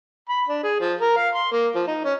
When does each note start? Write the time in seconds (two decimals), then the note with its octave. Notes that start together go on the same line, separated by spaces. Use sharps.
0.29 B5
0.48 D4
0.64 G#4
0.80 F3
1.01 A#4
1.17 F5
1.35 C6
1.52 A#3
1.75 F3
1.87 D#4
2.05 C#4